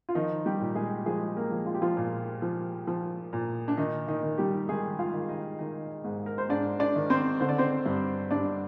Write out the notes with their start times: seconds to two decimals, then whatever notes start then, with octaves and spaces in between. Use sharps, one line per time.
0.09 F4
0.15 D#3 F3 D#4
0.46 G3 G4
0.60 A#2
0.75 G#3 G#4
1.06 F3 G#3 G#4
1.36 A#3 A#4
1.51 F3
1.66 F4
1.74 G4
1.82 F3 F4
1.97 A#2
2.42 F3
2.87 F3
3.33 A#2
3.68 D4
3.77 D#3 D#4
4.08 D#3 D#4
4.23 D#3
4.38 G3 G4
4.69 D#3 G#3 G#4
4.99 F4 F5
5.13 D#3
5.29 D#4 D#5
5.59 D#3 D#4 D#5
6.04 G#2
6.26 A#4
6.38 C5
6.49 G#2 D4 D5
6.80 D4 D5
6.95 D#3
7.10 C4 C5
7.40 D3 C5
7.49 D5
7.58 C4 C5
7.86 G2
8.31 G2 D4 D5